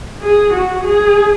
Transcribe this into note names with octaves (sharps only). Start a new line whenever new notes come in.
G#4
F#4
G#4